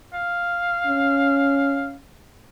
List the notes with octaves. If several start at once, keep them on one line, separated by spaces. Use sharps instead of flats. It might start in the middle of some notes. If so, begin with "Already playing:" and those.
F5
C#4